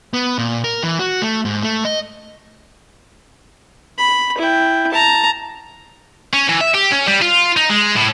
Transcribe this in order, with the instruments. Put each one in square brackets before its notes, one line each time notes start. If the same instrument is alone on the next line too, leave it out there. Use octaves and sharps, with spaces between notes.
[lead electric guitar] B3
A#2
A#4
E3
F#4
A3
G#2
A3
D#5
[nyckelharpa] B5
E4 G5
A5 A#5
[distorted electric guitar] C#4
E3
E5
G4
C#4
G3
F4
D#4
G#3
A2